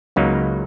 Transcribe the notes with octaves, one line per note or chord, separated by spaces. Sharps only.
C#2 C#3 F#3 A#3 D#4